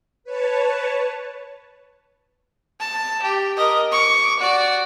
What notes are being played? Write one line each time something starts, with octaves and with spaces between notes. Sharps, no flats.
B4 C#5 A5
A5
G4
A#4 D#5
C#6 D6
F#4 D5